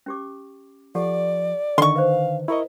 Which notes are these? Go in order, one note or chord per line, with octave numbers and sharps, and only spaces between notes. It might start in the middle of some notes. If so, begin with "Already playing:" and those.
C#4 G4 D6
F3 G4 A4 D5 F#5
D3 D#3 D#5 C6 C#6
B4 C5 F5
E4 A#4 D#5 C#6